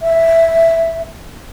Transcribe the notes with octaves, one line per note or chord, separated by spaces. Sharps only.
E5